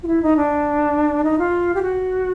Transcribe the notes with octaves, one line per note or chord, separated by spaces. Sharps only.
F4
E4
D#4
D4
D#4
F4
G4
F#4